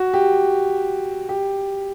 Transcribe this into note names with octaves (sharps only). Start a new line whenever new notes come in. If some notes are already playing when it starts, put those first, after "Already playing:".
Already playing: F#4
G4
G4